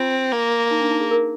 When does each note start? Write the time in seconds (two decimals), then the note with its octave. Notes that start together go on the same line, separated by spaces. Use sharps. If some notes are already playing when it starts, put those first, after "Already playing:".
Already playing: C4 F4
0.32 A#3
0.71 D#4
0.81 D4
0.91 D#4
1.01 G#4
1.11 A#4